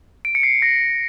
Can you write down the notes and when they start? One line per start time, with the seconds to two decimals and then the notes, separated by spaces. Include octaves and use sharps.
0.25 D7
0.35 C#7
0.43 C7
0.62 A#6